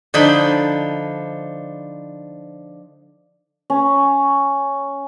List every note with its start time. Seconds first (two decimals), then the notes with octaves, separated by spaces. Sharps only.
0.14 D3 F3 D#4 B5
3.70 C#4